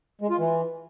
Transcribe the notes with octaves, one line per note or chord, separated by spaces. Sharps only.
G#3
F4
E3